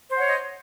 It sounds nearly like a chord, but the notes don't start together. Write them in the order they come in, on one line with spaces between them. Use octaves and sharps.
C5 F#5 C#5 D#5